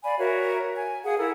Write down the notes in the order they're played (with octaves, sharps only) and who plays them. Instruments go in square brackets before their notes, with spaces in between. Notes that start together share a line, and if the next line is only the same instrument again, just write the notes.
[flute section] D5 F5 G#5 B5
F#4 A#4 C#5 E5
G#5
G#4 F5 F#5 G#5
E4 A4 A#4 F#5